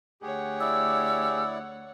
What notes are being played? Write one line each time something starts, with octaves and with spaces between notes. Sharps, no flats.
D2 G4 G#4 C#5 F#5
E4 D5 E6